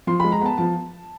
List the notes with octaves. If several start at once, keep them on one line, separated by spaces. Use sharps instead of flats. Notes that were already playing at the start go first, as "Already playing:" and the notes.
F3 C6
G#3 B5
A#5
B3 A5
F3 A5